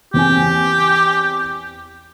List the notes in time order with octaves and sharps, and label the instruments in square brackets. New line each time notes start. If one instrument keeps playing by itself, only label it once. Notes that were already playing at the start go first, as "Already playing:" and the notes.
[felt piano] E2 C4 G#5 [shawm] G4